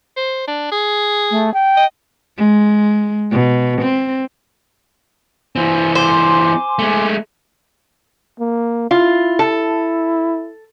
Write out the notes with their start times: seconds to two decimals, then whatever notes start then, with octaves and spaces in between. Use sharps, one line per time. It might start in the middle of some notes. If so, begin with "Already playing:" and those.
0.17 C5
0.48 D4
0.72 G#4
1.31 A3
1.54 G5
1.77 D#5
2.37 G#3
3.31 B2
3.81 C4
5.56 E3 C4 G#5 C6
5.95 C5 G#5 C6 D6
6.79 G#3 A3
8.40 A#3
8.91 E4 F4
9.39 A4